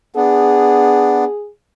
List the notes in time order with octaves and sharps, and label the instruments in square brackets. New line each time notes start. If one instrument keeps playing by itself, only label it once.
[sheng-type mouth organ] B3 D4 [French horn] G#4